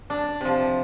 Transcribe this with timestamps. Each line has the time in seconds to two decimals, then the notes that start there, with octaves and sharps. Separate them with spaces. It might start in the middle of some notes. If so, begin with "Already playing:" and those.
0.10 D4
0.41 C3 F3